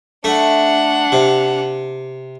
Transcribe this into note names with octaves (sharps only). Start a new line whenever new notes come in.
A3 D4 F#5
C3